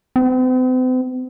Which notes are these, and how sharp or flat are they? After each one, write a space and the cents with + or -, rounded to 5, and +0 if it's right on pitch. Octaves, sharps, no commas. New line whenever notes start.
C4 -45